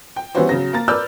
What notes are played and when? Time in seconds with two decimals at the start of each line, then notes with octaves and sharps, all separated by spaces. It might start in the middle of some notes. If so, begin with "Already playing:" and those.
0.16 G5
0.35 E3 G3 B3 C#4 F#4 C5
0.49 C#3 F#3 A#6
0.73 A#3 A#5 A6
0.88 A#4 B4 D5 E6 F6 G6